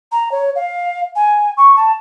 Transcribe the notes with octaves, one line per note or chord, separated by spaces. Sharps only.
A#5
C#5
F5
G#5
C#6
A5